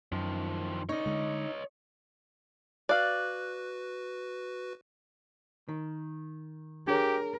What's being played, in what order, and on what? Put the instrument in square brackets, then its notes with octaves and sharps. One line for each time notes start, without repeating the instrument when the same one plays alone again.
[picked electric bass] F#2 [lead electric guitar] D#3 F3
[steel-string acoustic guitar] D#4 [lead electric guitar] C#5 D#5
[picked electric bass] D3 G#3
[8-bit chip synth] F#4 B4 [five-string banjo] D5 F5 [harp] F#6
[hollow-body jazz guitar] D#3
[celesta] D4 G#4 C#5 [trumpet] G4 [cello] A#4